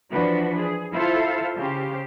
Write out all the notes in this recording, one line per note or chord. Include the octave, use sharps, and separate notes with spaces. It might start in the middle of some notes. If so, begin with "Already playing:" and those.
E3 F3 D4 F#4 B4
G#4
E4 F4 A4 C5 E5 F5
C#3 G4 C5 F5